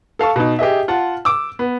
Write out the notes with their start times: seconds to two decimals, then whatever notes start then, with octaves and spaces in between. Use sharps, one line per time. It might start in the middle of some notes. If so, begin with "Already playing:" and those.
0.19 A4 F5 A5 C#6
0.36 B2 D#4
0.59 G4 G#4 D#5 E5
0.88 F4 F#5 A5
1.25 D6 E6
1.59 B3